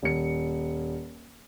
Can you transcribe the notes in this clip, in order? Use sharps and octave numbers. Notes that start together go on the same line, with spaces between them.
D#1 C#7